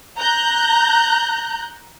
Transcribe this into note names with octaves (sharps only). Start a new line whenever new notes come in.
A#5 F#6 G6